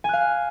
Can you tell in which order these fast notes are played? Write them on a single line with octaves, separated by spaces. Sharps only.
G#5 F#6 F5